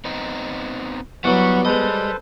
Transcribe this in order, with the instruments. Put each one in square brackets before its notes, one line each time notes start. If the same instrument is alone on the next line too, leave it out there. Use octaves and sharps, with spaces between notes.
[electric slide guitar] B3 C4 D#4
[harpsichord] E3 F#3 [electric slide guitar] G3 [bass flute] B3 [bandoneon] F#5 C#6
[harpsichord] G#3 D#5 [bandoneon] A4 B4 C5